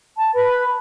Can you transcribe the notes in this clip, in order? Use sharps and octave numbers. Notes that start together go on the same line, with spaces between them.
A5
B4 B5